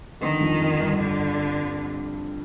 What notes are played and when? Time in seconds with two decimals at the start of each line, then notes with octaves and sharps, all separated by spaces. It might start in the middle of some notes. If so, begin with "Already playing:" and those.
0.21 D3 D#3
0.40 F2 F3
0.60 F2 F3
0.80 G2 G3
0.99 D3